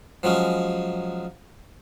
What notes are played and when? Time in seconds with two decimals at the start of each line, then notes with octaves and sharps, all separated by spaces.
0.23 F3 F#3 G#3 C#4